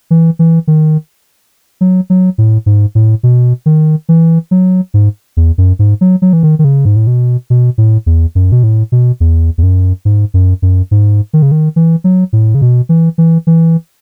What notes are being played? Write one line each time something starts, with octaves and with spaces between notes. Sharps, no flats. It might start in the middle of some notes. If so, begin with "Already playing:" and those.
E3
E3
D#3
F#3
F#3
A2
G#2
A2
B2
D#3
E3
F#3
G#2
E2
F#2
G#2
F#3
F#3
E3
D#3
D#3
C#3
G#2
A2
B2
B2
A2
E2
F#2
B2
A2
B2
E2
E2
F#2
G#2
F#2
F#2
G#2
D#3
C#3
D#3
E3
F#3
A2
C#3
B2
E3
E3
E3